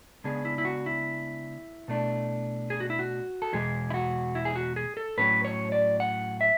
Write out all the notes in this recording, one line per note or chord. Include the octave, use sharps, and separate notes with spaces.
C#3 G#3 B3 D4 G#4
E4
E4
F#4
E4
B2 A3 D4
G#4
F#4
E4
F#4
A4
E2 B2 G#3 G#4
E4
F#4
E4
G#4
F#4
G#4
A4
A2 F#3 C#4 B4
C#5
D5
F#5
E5